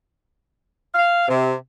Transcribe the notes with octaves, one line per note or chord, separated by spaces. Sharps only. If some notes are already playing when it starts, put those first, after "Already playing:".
F5
C3